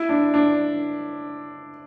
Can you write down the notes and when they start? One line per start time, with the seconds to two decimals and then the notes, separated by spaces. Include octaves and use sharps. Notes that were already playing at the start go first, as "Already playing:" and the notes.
Already playing: E4
0.09 D4
0.34 D4